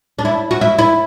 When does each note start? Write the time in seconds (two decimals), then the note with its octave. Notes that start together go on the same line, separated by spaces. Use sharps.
0.19 D4
0.25 E4
0.51 F#4
0.61 E4
0.79 E4